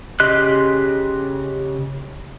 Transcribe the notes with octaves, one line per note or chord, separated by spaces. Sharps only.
C#3 G4 D#5 C6 F#6